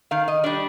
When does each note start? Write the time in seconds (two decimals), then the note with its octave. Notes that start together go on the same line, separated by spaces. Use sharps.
0.11 D#3 F5
0.28 D#5
0.44 G3 D4 D5